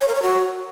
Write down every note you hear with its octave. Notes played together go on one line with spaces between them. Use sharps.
C#5
A#4
C#5
F#4